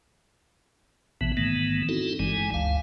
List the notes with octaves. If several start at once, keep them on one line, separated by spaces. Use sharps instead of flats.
A1 B2 E3 B3
G#2 D#3 E3 A3 B3
C4 D#4 E4 F#4 A4
G1 G2 E3 G#3 G#5
D2 F5